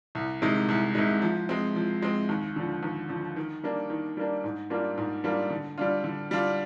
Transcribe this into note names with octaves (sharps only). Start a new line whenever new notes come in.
C2
C3 D#3 G#3
C2
C3 D#3 G#3
F3
G#3 C4
F3
G#3 C4
D#2
D3 F3
D#2
D3 F3
D#3
G3 A#3 D4
D#3
G3 A#3 D4
G#2
G3 A#3 D4 F4
G#2
G3 A#3 D4 F4
D3
G3 D4 F4
D3
G3 D4 F4